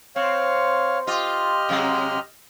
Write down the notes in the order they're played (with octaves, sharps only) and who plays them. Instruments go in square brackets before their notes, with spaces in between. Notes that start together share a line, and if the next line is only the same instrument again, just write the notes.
[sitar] C4 [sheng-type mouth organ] C#5 F5
[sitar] F4 [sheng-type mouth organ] G4 D#5 F6
[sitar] C3 F#3 G#3